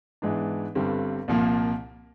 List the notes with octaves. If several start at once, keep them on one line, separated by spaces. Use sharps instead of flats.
G#2 E3 G#3 B3 D4
G1 G2 D3 G3 C4
C2 A#2 F3 A#3